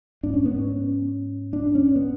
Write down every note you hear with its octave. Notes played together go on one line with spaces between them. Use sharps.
G#2 D4
C#4
B3
C#4
D4
C#4
B3